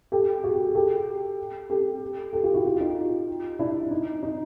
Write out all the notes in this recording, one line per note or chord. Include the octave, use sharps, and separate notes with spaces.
G4 A4
F#4 G#4
G4 A4
G4 A4
G4 A4
F4 G4
E4 F#4
F4 G4
D#4 F4
D4 E4
D#4
D#4